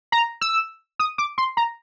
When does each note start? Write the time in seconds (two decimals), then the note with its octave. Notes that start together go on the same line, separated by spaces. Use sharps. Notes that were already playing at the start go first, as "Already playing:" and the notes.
0.12 A#5
0.41 E6
1.00 D#6
1.18 D6
1.38 C6
1.57 A#5